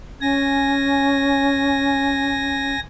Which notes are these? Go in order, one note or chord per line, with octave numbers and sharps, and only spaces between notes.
C#4 G#5 A#6